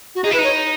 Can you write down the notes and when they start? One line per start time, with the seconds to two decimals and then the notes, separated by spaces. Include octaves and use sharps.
0.15 F#4
0.24 D#4 G#4
0.31 E4 B4
0.39 D#4 C#5